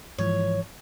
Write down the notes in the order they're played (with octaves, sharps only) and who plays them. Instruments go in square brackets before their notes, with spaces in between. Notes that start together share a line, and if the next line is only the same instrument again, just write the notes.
[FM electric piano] G#2 E3 F3 [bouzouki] C#5